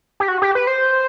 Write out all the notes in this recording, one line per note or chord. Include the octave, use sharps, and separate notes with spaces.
G4
F#4
G4
B4
C5